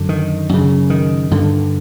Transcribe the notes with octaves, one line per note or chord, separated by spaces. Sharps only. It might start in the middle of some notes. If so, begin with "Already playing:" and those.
Already playing: F#2 D3
D#3
F#2 C#3
D#3
G2 D3